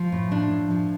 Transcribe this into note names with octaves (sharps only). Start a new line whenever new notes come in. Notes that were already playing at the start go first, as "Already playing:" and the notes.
Already playing: F3
A2
F3 D4
A2
F3